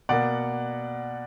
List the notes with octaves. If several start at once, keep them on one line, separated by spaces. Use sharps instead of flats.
B2 A#3 D5 F#5